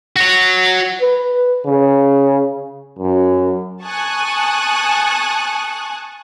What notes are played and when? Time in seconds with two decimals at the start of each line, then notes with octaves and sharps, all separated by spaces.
0.16 F#4 C#5
1.01 B4
1.66 C#3
2.99 F#2
3.83 G#5 A5 C#6 D#6 F#6